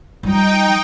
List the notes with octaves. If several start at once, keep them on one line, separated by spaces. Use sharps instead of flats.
F3 G3 D#4 G5